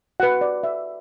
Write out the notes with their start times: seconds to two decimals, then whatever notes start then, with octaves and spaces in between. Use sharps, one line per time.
0.20 F#4 B4 F#5
0.41 D5
0.63 E5